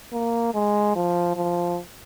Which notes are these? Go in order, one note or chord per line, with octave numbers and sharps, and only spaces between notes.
A#3
G#3
F3
F3